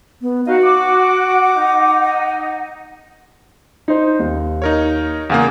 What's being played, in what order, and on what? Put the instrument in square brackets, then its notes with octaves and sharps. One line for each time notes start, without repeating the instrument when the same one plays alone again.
[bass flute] B3
[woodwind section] D#4 D#5 [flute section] F#4 [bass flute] F5
[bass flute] F#5 [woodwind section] D6
[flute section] D#4
[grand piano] D#4 C5
D#2
[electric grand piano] D#4 A#4 C#5
[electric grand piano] E2 C#3 A#3 [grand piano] F5 F#5 G#5